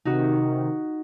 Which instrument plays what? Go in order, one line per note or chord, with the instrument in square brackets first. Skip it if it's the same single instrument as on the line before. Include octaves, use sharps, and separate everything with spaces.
[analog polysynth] C3 D#3 [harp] D#4 F#4